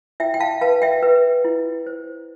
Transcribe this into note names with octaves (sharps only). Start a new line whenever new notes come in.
E4 E5 G5
G5
F5 A5
B4 F5 A5
E5 G5
B4
E4
C5